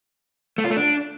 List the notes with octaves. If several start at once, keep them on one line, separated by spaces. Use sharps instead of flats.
A3
F4
A3
D4